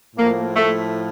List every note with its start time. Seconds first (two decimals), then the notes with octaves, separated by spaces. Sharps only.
0.15 A2 F3 A#3
0.56 A3